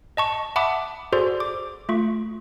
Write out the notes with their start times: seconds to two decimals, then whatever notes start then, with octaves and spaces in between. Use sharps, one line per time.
0.17 D#5 A5 C#6
0.56 E5 F#5 A5 B5 D6 D#6
1.12 F#4 G#4 A4 C5 D5 C6
1.40 D6
1.89 A3 F4 C#6